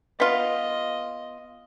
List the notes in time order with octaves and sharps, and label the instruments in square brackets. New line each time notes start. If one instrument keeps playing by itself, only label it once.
[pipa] B3 F4 [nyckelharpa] D#5